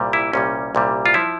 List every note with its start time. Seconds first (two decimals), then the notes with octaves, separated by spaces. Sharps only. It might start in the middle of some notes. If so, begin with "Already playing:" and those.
Already playing: C2 A#2 G3
0.13 E4
0.33 C2 A#2 G3 C#4
0.75 C2 A#2 G3
1.06 F4
1.14 F3 E4